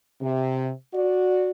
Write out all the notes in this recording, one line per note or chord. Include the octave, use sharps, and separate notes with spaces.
C3
F#4 D5